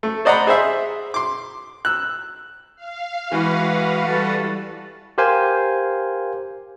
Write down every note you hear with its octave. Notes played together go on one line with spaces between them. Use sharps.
A3
C5 D5 D#5 F#5 A#5 B5
G#4 C5 E5
C6 D6
E6 F#6
F5
E3 G#3 F#4 B4 F#5
G3 A4
G4 A#4 C5 F5 G#5